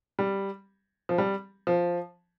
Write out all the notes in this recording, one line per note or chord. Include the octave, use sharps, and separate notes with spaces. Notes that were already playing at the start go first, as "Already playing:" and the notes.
G3
F3
G3
F3